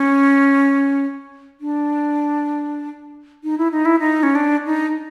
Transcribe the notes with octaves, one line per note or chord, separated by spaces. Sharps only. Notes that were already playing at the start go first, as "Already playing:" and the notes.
Already playing: C#4
D4
D#4
E4
D#4
E4
D#4
C#4
D4
D#4